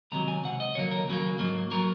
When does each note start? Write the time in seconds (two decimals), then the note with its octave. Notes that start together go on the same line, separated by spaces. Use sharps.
0.12 C#2 C3 D#3 F#3 A#5
0.28 G#5
0.44 C#2 C3 F#5
0.60 D#5
0.75 D#2 C#3 F#3 A#3 C#5
0.91 A#4
1.08 D#2 C#3 F#3 A#3
1.39 G#2 F#3 A#3
1.71 F#3 A#3 A#4